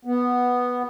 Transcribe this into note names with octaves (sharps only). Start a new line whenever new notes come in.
B3